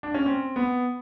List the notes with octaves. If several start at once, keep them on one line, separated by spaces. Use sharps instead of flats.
D4
C#4
C4
B3